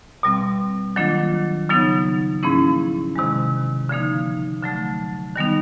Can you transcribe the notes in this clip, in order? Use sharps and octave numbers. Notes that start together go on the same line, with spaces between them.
B2 G3 C4
D#3 F#3 A#3 D4 F4
C#3 F#3 B3 D#4
G#2 F3 A#3 C#4 E4
C3 D#3 G#3
D3 F3 A#3 D#4
D3 F#3 A3
D#3 G3 B3 D#4